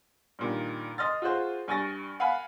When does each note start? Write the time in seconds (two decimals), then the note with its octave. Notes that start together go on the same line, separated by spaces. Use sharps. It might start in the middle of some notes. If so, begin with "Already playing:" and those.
0.39 G2 A#2 D#3
0.98 D#5 C6 F6 A6
1.22 F4 F#4 G#4 C5
1.68 G2 G#5 C#6 A6 A#6
2.20 F5 F#5 G#5 B5